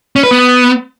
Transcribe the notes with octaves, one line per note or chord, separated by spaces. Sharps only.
C#4
B4
B3